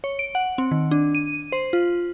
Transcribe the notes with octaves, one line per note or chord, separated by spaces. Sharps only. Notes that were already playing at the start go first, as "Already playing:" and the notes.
C#5
D7
F#5
C4
D#3
D4
D#7
C5
F4